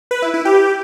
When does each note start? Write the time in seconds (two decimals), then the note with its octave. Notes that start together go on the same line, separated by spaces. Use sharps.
0.11 B4
0.22 E4
0.34 E4
0.45 G4